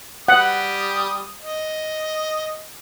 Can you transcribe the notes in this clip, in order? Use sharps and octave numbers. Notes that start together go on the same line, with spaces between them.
G3 G4 F#5 D#6
D#5